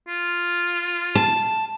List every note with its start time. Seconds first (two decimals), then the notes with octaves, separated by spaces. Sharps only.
0.08 F4
1.15 A5